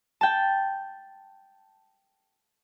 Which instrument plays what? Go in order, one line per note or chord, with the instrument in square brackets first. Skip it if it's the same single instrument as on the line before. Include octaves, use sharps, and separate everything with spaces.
[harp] G5 A5